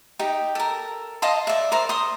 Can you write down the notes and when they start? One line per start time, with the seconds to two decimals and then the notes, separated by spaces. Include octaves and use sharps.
0.19 D#4 G4
0.55 A4 A#4
1.22 D#5 F5 A5 C6
1.47 D5 E5
1.72 A#4 C5 D5 C6
1.89 C6 D#6